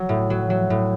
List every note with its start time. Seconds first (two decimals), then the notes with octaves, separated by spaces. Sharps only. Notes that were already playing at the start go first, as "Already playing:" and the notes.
Already playing: F#3
0.09 A2
0.30 F#3
0.50 F#3
0.70 A2